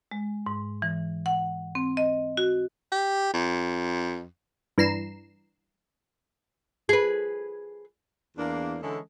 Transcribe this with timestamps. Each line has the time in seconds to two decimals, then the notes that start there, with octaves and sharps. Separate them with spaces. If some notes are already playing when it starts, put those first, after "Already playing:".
0.11 G#3
0.47 G#2
0.82 E3
1.26 F#5
1.75 C4
1.97 D#5
2.37 F#4
2.92 G4
3.34 F2
4.78 G2 E3 A#5 C7 E7
6.89 G#4 B4
8.37 E2 A#3 D4
8.82 D3 E3 G#3 C#4 E4 A4